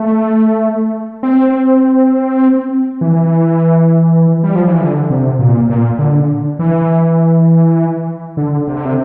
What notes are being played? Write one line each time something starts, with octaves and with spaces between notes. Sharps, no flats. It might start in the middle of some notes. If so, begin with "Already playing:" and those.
Already playing: A3
C4
E3
G3
F3
E3
D3
C3
A#2
A#2
D3
E3
D3
C3
D3
C3